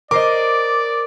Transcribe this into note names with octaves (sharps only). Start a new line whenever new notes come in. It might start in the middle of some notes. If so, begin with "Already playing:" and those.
A#4 C5 D5 D#5 D6